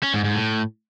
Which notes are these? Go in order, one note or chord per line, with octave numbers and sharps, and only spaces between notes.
C#4
G#2
G#2
A2